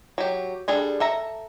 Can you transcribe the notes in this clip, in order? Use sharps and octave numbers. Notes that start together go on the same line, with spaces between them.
F#3 G4
G3 D4 G#4 A4
A4 E5 A#5